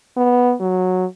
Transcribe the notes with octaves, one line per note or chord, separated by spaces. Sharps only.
B3
F#3